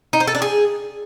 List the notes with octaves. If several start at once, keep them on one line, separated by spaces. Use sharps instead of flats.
D#4
C5
A4
D4
G#4